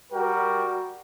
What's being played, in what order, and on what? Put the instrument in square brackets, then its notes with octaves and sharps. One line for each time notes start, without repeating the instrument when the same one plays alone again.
[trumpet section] G3 F#4 A#4 G5